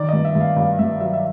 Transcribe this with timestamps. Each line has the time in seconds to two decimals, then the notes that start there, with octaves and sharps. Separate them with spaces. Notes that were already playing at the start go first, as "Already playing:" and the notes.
Already playing: D#3 D5
0.09 G2 D#5
0.25 E5
0.35 G2
0.41 F5
0.57 G2 F5
0.79 G2 E5
1.00 F#3 E5
1.14 E5